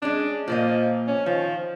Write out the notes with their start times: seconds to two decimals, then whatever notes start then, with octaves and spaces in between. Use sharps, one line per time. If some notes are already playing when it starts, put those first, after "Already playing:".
0.02 G#3 C#4 D4
0.48 A#2 F3 A#3 D#5
1.08 C#4
1.26 D#3 F3